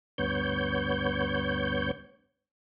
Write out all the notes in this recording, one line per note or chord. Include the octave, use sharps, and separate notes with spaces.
D2 G2 B3 C#5 G6